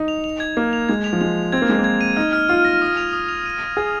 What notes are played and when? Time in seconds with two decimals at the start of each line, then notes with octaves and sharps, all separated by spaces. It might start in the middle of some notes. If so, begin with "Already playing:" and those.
Already playing: D#4
0.08 F7
0.24 F7
0.40 G#6
0.57 A#3 G#6
0.73 F7
0.89 G#3 G#6
1.04 F7
1.13 F3
1.21 G#3 F7
1.37 F7
1.52 C4 G#6
1.62 A#3
1.69 G#3 G#6
1.79 A#3
1.84 G#6
2.01 D#7
2.16 D#4 F6
2.33 F6
2.49 F4 F6
2.65 A#6
2.82 D#6
2.97 F7
3.13 D#6
3.29 F7
3.46 D#7
3.61 D#7
3.77 G#4 G#6